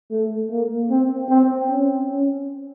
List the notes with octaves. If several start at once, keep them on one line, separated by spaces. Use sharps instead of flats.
A3
A#3
C4
C4
C#4
C#4